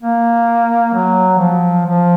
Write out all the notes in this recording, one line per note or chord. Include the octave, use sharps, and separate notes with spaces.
A#3
F#3
F3
F3